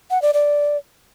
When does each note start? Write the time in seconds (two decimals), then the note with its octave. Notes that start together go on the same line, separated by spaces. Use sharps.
0.10 F#5
0.22 D5
0.34 D5